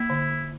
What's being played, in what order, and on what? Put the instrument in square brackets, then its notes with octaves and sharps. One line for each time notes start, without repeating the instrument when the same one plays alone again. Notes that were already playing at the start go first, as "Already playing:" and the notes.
Already playing: [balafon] A#3 [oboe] E4
[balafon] D3